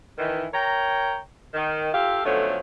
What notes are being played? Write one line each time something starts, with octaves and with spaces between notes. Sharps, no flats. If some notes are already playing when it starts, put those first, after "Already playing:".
D#3 E3
A#4 C#5 G5 A#5
D#3
F4 G4 A4 E5 F5
B2 D3 F3 F#3 A3 C#4